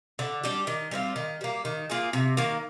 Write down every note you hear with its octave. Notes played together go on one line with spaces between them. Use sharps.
D3
G3 D4 G4
D#3
G3 C4 F4
D#3
G3 A#3
D#3
A#3 F4 G#4
C3
D#3 A#3